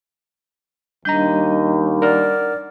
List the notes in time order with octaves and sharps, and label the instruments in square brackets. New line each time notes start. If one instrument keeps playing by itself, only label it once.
[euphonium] D#2 [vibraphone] G3 D4 D#5 [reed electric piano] A#5 G6
[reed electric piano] A#4 F#5 F6 [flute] D5